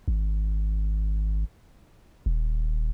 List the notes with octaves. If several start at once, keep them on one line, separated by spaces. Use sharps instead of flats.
G#1
D#1